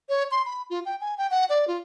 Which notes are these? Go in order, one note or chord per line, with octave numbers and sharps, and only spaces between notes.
C#5
C6
B5
F4
G5
G#5
G5
F#5
D5
F4